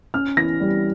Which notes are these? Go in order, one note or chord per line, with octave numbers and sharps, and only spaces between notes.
C#4 F6
E3 A#6
G3